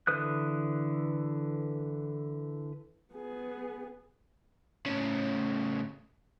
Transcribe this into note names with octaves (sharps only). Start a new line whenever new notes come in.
D3 E3 B4 D#6 F#6
B3 G#4
A2 C#3